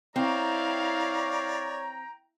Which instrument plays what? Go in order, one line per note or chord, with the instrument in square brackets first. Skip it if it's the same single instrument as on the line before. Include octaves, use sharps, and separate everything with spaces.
[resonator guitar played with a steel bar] C4 [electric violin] E4 F5 [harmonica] C#5 D5 [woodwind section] G5 A#5